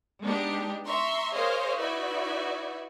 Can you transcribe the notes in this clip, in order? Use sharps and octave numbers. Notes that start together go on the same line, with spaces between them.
G#3 B3 D4 D#4 G4
E5 A#5 C6 C#6
G#4 A#4 C5 C#5 D#5 F5
D#4 E4 F#4 B4 D5 E5